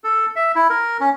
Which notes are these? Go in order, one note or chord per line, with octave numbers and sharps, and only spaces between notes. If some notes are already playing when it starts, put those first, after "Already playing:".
A4
E5
E4
A#4
C#4